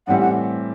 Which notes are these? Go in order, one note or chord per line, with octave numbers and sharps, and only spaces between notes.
A2 E3 G3 C4 G4 F#5
F#5